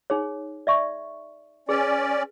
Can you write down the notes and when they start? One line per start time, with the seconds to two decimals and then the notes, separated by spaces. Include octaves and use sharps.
0.10 D#4 G#4 C#5
0.67 D5 E5 C#6
1.69 C#4 G#4 B4 D5